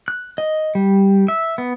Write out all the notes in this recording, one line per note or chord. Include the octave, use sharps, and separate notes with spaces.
F#6
D#5
G3
E5
B3